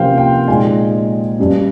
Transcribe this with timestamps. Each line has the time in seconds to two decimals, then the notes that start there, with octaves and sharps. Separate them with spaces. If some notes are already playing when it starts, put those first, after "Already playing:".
Already playing: C3 F3 A#3 C#4 C5 F5 G5
0.18 G5
0.48 A#2 G#3 D#4 G#5
1.39 G2 G3 C#4